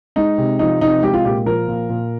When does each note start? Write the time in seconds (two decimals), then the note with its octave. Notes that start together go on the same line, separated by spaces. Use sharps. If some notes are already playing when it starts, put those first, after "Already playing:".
0.16 G#3 D#4
0.38 C3
0.59 F3 D#4
0.81 C3 D#4
1.02 G#3 G4
1.14 F4
1.25 A#2 G4
1.46 F3 A#4
1.68 A#2
1.89 A#2